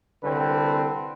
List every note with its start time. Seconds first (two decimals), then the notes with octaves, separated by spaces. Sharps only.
0.23 C2 D3 C4 B4